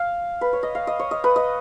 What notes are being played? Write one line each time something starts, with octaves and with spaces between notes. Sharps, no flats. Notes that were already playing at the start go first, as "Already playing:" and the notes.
Already playing: F5
B4
C#5
D#5
F5
D#5
C#5
D#5
B4
D#5